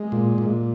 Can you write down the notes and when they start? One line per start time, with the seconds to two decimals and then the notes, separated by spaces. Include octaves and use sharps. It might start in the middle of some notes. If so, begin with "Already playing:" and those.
Already playing: G#3
0.12 A#2
0.38 A#2